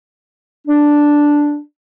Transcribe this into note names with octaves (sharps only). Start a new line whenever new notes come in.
D4